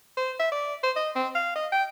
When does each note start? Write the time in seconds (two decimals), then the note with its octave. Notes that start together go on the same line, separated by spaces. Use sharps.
0.17 C5
0.39 E5
0.52 D5
0.83 C5
0.96 D#5
1.15 C4
1.35 F5
1.55 D#5
1.72 G5